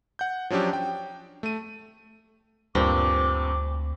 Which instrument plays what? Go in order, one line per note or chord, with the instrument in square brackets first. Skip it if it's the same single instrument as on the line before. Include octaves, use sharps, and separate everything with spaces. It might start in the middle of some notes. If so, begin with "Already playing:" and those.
[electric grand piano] F#5 G6
F3 F#3 C#4 D4 G4
G5
A3 D#7
[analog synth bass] D2 [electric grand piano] G2 A#2 [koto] C4 [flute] D6